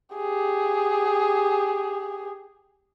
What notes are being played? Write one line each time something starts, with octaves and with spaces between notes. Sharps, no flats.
G4 G#4